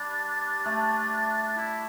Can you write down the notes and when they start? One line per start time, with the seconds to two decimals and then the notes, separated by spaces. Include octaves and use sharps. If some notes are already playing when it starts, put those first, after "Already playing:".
Already playing: G3 D4 G4
0.65 A3 A4
1.57 E4